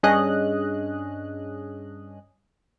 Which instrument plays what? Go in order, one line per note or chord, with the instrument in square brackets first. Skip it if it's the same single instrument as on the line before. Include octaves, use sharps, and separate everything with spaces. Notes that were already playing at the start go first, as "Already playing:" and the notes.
[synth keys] G2 C#4 D4 G#4 D#5 F#6